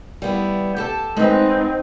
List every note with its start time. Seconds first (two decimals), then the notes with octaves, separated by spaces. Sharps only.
0.22 G3 B3 E4
0.77 G4 A4 A5
1.17 G#3 B3 C4 D#4 B4